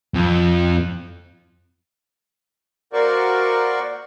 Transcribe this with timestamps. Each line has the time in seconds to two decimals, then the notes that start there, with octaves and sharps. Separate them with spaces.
0.14 F2
2.93 A#3 F#4 A#4 C5 D5 C#6